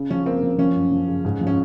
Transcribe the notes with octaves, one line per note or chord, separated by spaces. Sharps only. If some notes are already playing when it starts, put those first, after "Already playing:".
Already playing: C#3
F3 C#4
A#3 C4
F3
F3 C#4
F#2
F3
C#3
G#2
F3
C#4